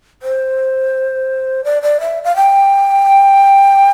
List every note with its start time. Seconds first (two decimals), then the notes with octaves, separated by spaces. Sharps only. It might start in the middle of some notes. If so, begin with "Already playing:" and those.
0.22 C5
1.64 D5
1.82 D5
2.00 E5
2.24 F5
2.36 G5